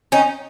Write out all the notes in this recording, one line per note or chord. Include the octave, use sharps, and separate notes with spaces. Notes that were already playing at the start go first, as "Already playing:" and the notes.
C#4 D#4